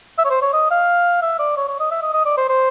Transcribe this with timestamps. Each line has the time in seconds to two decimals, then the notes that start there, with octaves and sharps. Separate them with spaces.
0.18 E5
0.25 C#5
0.30 C5
0.42 C#5
0.53 D#5
0.71 F5
1.22 E5
1.39 D5
1.57 C#5
1.68 C#5
1.80 D#5
1.91 E5
2.02 D#5
2.13 D#5
2.25 D5
2.37 C5
2.49 C5